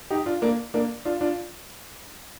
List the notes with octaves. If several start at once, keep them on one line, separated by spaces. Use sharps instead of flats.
D#4 G4
D4 F4
A#3 D4
A#3 D4
D4 F4
D4 F4